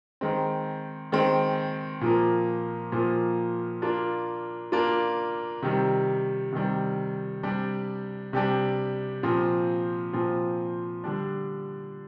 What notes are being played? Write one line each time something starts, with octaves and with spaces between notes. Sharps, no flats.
D#3 G#3 C4
D#3 G#3 C4
A#2 F3 A#3
A#2 F3 A#3
A#3 D4 F4
A#3 D4 F4
C3 D#3 G3
C3 D#3 G3
C3 G3 D4 G4
C3 G3 D4 G4
A#2 F3 C4
A#2 F3 C4
D3 G3 D4